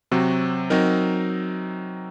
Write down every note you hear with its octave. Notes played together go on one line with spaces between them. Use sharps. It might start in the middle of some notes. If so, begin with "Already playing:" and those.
C3 F#3 C4 F#4
F#3 C4 D#4 A#4